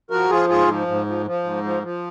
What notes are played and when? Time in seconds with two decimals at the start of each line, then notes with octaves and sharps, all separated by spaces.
0.10 F3 F#4 A#4
0.30 F3 F4 G#4
0.49 G#2 F4 G#4
0.68 F3
0.87 G#2
1.06 F3
1.26 F3
1.44 G#2
1.64 F3
1.83 F3